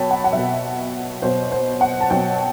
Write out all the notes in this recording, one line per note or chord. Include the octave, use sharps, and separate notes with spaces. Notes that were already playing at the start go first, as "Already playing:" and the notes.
Already playing: B2 F#3 G5 A5 B5
F#5
F#5
B2 F#3 E5
B2 F#3 C5
C5
F#5
A5
B2 F#3 G5